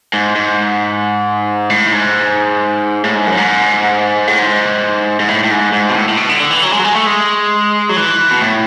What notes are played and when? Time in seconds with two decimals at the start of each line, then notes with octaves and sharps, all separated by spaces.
0.13 G#2
0.36 G#2
1.70 A2
1.92 G#2
3.04 A2
3.15 G#2
3.27 F#2
3.37 G#2
4.27 A2
4.39 G#2
5.20 G#2
5.28 A2
5.44 A2
5.51 G#2
5.73 G#2
5.89 B2
5.95 A2
6.09 A2
6.17 B2
6.29 D3
6.40 D3
6.51 E3
6.63 F#3
6.73 G#3
6.79 F#3
6.84 G#3
6.95 A3
7.07 G#3
7.89 F#3
7.97 E3
8.31 B2
8.41 A2